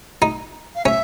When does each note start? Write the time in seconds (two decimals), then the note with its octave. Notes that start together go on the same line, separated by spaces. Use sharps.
0.22 D#4
0.76 F5
0.85 C#4 E5